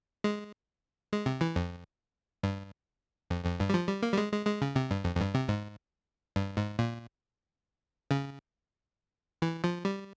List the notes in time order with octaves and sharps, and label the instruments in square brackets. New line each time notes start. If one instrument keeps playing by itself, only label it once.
[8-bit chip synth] G#3
G#3
C3
E3
F2
G2
F2
F2
G2
G3
F3
G3
A#3
G3
G#3
G#3
G#3
C#3
C3
G2
F2
F2
G2
C3
G#2
G2
G#2
A#2
C#3
E3
F3
G3